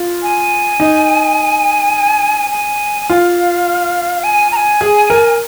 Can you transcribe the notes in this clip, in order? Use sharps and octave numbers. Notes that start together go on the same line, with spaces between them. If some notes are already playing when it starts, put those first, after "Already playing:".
Already playing: F4
G#5
D#4
G#5
F4 F5 G#5
G#5
A#5
G#5
G#4
A#4